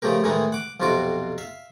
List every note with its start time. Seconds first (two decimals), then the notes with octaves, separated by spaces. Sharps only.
0.02 C#3 F3 A3 G4 A#4
0.24 A2 D#3 E3 G#3 D#4
0.52 F#5 D6
0.80 B1 F2 C3 F4 F#4 D6
1.38 E5 F5